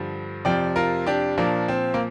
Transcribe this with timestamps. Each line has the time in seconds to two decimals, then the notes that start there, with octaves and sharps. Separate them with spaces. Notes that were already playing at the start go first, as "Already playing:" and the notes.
Already playing: G2 D3 F3
0.45 F2 C3 F3 D5 G5
0.76 F4 A#4
1.06 D4 G4
1.38 A#2 F3 A#3 D4
1.68 C4
1.94 A#3